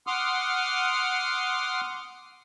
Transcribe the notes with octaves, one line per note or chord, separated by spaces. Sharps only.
F#5 C6 D6 D#6 F6